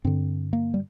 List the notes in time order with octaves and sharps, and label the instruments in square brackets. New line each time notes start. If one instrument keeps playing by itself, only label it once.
[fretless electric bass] G2 D3 C4
A#3
G3